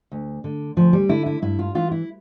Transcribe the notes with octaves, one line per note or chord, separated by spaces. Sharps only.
D2
D3
D2 F3
G3
D3 E4
E4
G2 E4
F4
E3 F4
E4